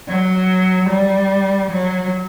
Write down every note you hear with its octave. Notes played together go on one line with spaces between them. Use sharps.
F#3
G3
F#3